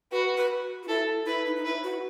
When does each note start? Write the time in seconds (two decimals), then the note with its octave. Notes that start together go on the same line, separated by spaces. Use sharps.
0.11 F#4 B4
0.37 B4
0.83 F#4
0.88 E4 A4
1.26 E4 B4
1.45 D#4
1.56 D#4
1.65 E4 B4
1.84 F#4